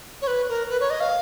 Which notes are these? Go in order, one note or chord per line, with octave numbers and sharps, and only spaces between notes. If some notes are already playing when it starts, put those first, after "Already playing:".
C#5
B4
A#4
B4
C#5
D#5
F5